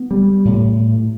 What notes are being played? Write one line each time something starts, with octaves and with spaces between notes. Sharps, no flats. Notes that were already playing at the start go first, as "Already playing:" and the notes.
Already playing: B3
G3
A2